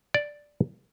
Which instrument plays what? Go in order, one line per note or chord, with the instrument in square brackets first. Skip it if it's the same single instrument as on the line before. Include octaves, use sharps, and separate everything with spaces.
[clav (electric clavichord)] D5